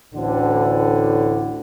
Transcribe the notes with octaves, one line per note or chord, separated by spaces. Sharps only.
A1 D2 A2 D3